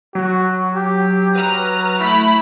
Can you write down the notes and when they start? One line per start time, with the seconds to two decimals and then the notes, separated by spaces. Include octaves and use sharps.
0.15 F#3 F#4
0.75 G4
1.35 F#3 B4 A#5 F6
2.01 A3 E4 B5